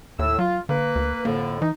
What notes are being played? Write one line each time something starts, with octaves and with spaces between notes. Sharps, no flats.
D#2 A2 E6
F#3 F4
D3 A#3 B4
D2
F2 A2 D3 A#3
E3 D#4